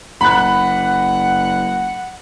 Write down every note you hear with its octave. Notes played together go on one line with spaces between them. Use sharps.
F#1 F#5 B5 F#6